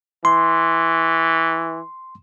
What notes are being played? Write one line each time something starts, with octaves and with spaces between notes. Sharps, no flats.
E3 C6